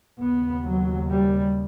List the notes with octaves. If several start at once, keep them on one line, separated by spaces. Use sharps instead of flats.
D#2 C#3 B3
F#3
G3